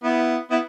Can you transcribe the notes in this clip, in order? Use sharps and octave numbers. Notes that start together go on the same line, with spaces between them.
B3 E4
B3 E4